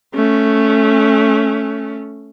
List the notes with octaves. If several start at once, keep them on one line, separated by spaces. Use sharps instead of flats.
A3 C#4